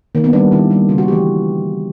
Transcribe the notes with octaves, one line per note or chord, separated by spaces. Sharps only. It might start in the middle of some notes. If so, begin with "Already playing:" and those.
D#3 A#3
B3
G3 A#3 D4
D#3 E4
G3 A#3
C#3 F4
F#4
E3 A3 G4